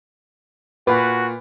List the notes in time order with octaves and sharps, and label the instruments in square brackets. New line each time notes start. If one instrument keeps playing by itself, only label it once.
[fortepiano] A#2 [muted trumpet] F#4 [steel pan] B4